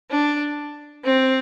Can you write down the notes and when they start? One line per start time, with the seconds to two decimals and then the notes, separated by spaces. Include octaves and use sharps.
0.11 D4
1.05 C4